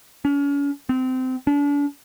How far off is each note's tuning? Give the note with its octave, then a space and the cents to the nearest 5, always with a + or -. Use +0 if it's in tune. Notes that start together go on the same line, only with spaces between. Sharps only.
C#4 +40
C4 -25
D4 -40